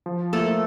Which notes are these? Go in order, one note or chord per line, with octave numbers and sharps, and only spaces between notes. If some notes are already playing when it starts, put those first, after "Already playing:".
F3
A3 A#3 A4